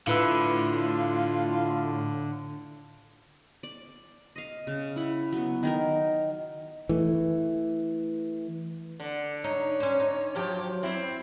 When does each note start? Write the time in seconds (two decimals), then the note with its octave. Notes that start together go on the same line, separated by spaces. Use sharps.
0.07 A2 D3 E4 F4 B4 E6
3.63 D5
4.36 D#5 F5
4.67 C#3
4.96 E4 F#5
5.32 F#3 B3
5.63 D#3 D#4 A#4
6.89 E3 A3
9.00 D3
9.44 D#4 C#5
9.80 C#4 C5
10.00 D#4
10.35 F#2 F3 F#3 G4
10.83 F#2 C4 E4